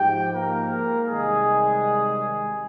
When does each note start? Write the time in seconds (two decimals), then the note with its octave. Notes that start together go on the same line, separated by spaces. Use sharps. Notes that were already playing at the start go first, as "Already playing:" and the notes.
Already playing: G#2 F3 G4 G5
0.35 A#3 A#4
1.08 C3 D#3 G3 G#3 G#4